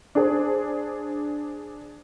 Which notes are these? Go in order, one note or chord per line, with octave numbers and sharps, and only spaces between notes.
D4 G#4 C5